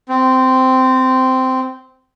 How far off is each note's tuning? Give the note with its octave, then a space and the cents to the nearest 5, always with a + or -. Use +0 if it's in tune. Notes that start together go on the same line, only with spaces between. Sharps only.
C4 -10